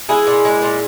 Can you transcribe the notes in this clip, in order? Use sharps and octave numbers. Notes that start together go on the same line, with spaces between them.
G#3 E4 G#4
A#2
G#3
A#2